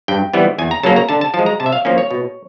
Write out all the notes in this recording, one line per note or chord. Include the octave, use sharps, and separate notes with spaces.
G2 G5
E3 G3 B3
E2 G#5
A#5
C#3 F#3 A#3 C#4 A5
A#5
D3 A5
A5
F3 A5
G#3
A#5
C3 A5
E5
F5
F3 A#3 C#4
C#5
B2